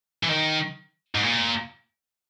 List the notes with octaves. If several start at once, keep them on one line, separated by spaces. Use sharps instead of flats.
E3
D#3
G#2
A#2